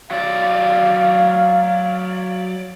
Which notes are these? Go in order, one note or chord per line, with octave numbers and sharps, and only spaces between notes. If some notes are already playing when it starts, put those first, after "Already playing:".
F#3 D5 F5